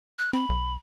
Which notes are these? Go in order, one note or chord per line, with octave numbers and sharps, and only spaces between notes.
F#6
C4 B5
B1